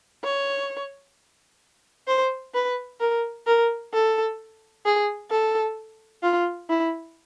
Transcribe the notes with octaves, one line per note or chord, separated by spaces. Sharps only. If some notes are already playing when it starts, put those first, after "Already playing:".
C#5
C5
B4
A#4
A#4
A4
G#4
A4
F4
E4